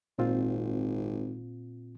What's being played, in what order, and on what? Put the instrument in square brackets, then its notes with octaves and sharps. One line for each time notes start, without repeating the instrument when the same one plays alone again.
[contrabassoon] G#1 [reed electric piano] A#2 C4 F4